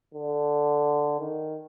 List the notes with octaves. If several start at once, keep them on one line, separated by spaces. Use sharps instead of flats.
D3
D#3